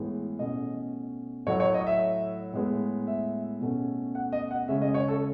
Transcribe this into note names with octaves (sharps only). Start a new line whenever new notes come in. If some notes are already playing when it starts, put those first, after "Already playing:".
Already playing: A2 E3 G#3 B3
B2 A3 C#4 D#5
A2 F#3 A3 C#5
C#5
D#5
E5
A2 G#3 B3
E5
B2 A3 C#4
F#5
D#5
F#5
C#3 G#3 C#4 E5
D#5
C#5
A4